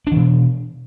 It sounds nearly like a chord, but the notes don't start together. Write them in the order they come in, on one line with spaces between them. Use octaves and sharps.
D4 E3 B2